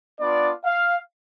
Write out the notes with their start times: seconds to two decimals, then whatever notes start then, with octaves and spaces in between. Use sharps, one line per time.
0.19 B3 D4 F4 D5
0.65 F5